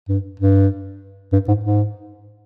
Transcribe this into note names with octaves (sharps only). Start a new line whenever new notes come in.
G2
G2
G2
G#2
G#2